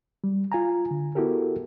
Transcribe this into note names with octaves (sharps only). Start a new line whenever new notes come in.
G3
F4 G#5 A#5
D3
B3 E4 F#4 G4 A4 A#4